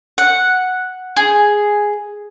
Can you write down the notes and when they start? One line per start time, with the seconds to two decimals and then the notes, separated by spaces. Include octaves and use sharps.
0.18 F#5
1.16 G#4